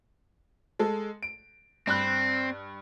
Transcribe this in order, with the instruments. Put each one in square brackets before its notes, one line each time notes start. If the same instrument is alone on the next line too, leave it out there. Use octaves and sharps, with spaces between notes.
[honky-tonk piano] G#3 A4
D7
[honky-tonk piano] G2 B5 F#6 [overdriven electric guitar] C4